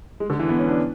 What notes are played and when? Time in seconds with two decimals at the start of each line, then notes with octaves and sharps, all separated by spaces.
0.20 G#3
0.30 D3
0.39 E3
0.49 B3
0.59 C#4
0.69 D4